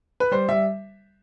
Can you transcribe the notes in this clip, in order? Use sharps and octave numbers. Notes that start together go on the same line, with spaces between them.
B4
G3 C5
G3 E5